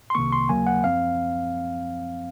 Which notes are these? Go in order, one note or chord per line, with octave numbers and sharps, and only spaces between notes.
C6
C2 C3 D#3 A#3 C#6
C6
D#2 C#3 F#3 A#3 G#5
F#5
F#2 F3 C4 F5